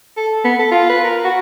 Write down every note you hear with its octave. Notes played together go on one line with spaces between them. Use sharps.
A4
B3
A4
F4
B4
A#4
F#4